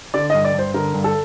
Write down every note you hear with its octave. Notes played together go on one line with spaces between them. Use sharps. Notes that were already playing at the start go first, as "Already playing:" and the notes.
D3 D5
G2 D#5
D5
G2
C5
D3 A#4
G2
A4